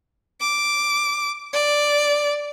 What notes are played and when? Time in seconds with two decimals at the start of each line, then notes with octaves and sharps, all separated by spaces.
0.40 D6
1.53 D5